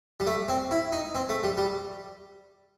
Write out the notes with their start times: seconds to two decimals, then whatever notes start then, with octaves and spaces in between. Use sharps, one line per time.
0.20 G3
0.27 A3
0.49 C4
0.71 E4
0.92 D#4
1.15 C4
1.29 A3
1.43 G3
1.57 G3